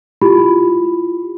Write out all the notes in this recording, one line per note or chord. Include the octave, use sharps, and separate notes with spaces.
E4 F4 G4 B5